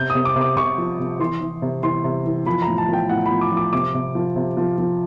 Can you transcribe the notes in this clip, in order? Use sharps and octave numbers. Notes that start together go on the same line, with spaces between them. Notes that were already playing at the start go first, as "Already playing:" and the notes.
Already playing: C3 G6
D#6
C3
D6
C3
D6
C3 C#6
F3
C3
E3 C6
E3
C3
E3 C6
C3
E3
F3 B5
A#5
A2
A5
F3 G5
A2 F#5
B5
F3
D6
F3
D6
C3 D6
C3
F3
C3
F3
F3